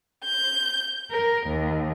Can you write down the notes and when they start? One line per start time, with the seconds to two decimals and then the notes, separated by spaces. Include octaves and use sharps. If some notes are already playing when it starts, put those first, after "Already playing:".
0.25 G6
1.11 A#4
1.46 D#2